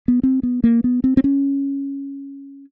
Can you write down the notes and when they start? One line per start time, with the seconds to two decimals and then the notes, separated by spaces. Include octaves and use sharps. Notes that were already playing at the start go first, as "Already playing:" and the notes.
0.08 B3
0.23 C4
0.43 B3
0.64 A#3
0.84 B3
1.04 C4
1.17 C4
1.24 C#4